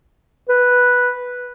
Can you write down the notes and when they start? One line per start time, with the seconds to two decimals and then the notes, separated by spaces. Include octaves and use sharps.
0.49 B4